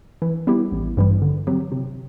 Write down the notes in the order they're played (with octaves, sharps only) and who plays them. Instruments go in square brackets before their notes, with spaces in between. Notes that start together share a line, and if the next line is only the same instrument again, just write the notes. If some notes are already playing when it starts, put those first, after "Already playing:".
[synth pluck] E3
G3 B3 E4 G4
A1
G2 E3 G3
D3
F#3 C4 G4
C3